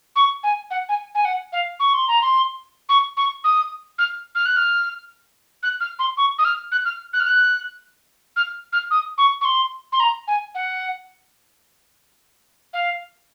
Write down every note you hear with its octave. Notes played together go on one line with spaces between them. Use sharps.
C#6
G#5
F#5
G#5
G#5
F#5
F5
C#6
C6
A#5
C6
C#6
C#6
D#6
F6
F6
F#6
F6
F#6
F6
C6
C#6
D#6
F6
F#6
F6
F#6
F6
F#6
F6
F6
D#6
C#6
C#6
C6
C6
A#5
G#5
F#5
F5